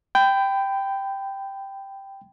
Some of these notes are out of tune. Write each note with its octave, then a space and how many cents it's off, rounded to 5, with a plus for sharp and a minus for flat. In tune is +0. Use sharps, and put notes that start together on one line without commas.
G5 +0 B5 +30